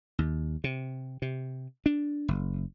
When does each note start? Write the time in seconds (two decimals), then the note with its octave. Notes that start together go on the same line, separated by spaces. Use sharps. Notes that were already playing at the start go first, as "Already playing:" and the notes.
0.19 D#2
0.64 C3
1.22 C3
1.86 D4
2.28 F#1